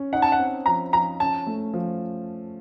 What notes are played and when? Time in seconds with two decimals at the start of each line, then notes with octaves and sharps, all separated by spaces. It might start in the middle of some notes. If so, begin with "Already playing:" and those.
Already playing: C#4
0.13 D#4 F#5
0.22 A5
0.32 F#5
0.39 C4
0.66 F3 A#5
0.93 F3 A#5
1.20 C#4 A5
1.47 A3
1.73 F3